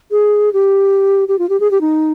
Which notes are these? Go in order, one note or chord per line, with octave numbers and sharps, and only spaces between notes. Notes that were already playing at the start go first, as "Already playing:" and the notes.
G#4
G4
G4
F4
G4
G#4
G4
D#4